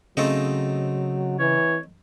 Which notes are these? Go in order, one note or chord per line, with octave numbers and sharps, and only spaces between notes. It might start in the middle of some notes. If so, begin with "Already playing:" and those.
C#3 F#3 A3 C4 D#4
E3 C#5